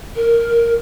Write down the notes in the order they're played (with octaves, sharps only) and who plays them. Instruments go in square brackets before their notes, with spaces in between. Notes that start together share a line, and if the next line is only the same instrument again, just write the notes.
[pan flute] A#4